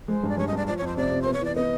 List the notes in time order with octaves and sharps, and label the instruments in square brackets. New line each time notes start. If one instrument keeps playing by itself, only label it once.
[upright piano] G#3 [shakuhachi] C5
[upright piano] G2
[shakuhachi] D5
[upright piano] G2 [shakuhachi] C#5
[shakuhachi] D#5
[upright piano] G2 [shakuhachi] D5
[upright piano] F3 [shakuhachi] D5
[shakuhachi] C#5
[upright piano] F2 [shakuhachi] C5
[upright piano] C3 [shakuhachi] D5
[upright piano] C3
[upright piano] B3 [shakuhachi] C5
[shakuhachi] C#5
[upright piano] E3 [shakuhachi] D5
[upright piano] B3 [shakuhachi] D#5